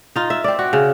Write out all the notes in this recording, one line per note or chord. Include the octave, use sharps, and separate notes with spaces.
D#4 F4
E5
C4 D5
F#4
C#3